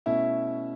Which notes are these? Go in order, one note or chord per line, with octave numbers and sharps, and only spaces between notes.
B2 A3 C#4 E4 E5